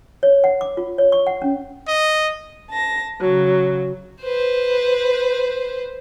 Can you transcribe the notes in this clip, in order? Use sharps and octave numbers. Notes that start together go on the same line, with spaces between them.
C#5
F#5
D6
F4
C#5
C#6
F#5
C#4
D#5
A5 A#6
C#3 F#3
B4 C5